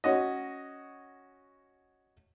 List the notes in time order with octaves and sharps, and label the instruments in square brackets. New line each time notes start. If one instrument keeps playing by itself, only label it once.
[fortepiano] C#4 F#4 D#5